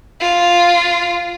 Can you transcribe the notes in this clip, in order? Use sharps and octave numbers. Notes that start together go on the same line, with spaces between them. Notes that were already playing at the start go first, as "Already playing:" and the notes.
F4